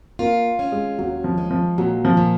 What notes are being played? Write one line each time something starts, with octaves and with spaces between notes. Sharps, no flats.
A#3 F4
C#4
G#3
D#2 F#3
F3
G#3
F3
A#2 F#3
F3
A#2